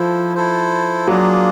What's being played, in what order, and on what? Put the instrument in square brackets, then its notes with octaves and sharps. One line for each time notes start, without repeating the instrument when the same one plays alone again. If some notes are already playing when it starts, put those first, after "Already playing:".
Already playing: [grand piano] F3 [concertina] E4 A4 C5
[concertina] E4 A4 C5
[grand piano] F#3 [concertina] A#3 D4 F4 G#4